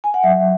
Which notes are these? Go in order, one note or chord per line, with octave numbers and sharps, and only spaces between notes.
G#5
F#5
F#3 E5